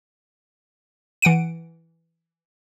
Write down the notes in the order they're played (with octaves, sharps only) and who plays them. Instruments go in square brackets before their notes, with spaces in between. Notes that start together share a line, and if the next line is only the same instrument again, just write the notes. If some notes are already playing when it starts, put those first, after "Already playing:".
[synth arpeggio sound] E3 F#5 D7 D#7